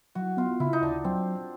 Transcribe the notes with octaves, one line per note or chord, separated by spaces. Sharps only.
F#3 F#4
B3 F4
C#3 E4
D#4
D2 D4
F#3 C4